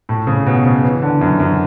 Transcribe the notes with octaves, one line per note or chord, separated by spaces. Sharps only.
A2
C#3
B2
C#3
E3
D3
F#2
F#2